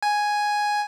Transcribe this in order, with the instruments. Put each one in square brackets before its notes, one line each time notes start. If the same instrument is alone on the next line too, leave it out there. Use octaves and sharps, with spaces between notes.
[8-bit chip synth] G#5